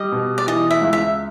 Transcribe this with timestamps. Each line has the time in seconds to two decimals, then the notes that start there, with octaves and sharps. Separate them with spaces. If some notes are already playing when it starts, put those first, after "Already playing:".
Already playing: G3 D#5
0.12 B2
0.38 D5
0.47 E3 D#5
0.71 E5
0.81 C#2
0.93 E5